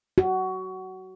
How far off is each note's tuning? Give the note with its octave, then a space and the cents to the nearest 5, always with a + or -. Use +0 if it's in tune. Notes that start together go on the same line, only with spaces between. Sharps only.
F#4 +20